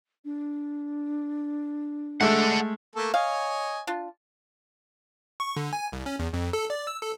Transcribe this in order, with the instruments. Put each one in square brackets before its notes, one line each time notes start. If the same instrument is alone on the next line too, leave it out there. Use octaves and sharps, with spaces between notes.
[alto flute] D4
[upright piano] G#3 A3 [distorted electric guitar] A4 F#5
[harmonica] A3 A#3 A4
[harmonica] C#5 D#5 G#5 [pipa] F5
[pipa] D4 F4
[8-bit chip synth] C#6
D3
G#5
C2
C#4
E2
F2
A4
D5
E6
A4